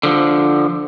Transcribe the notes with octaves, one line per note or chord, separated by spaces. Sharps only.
D3 F3